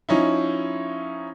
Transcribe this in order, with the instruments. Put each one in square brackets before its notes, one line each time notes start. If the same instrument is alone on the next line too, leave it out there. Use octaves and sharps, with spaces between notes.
[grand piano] F3 C#4 D#4 E4